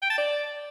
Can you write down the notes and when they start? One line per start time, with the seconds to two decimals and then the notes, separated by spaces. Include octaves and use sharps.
0.02 G5
0.10 A5
0.18 D5